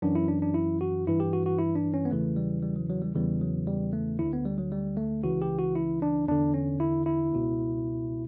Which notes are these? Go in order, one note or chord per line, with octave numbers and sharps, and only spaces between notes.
F#2 E3 D4
E4
D4
D4
E4
F#4
G2 E3 E4
G4
F#4
F#4
E4
D4
C#4
B3
E2 C#3 E3 A3
G3
G3
F#3
F#3
G3
E2 C#3 E3 G3
F#3
G3
A3
D2 D3 E4
B3
G3
F#3
G3
A3
C#2 C#3 E3 F#4
G4
F#4
E4
D4
E2 D3 D4
C#4
E4
E4
C#2 B2